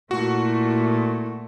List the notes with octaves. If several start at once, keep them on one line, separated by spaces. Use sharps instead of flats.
A#2 A3 E4 F#4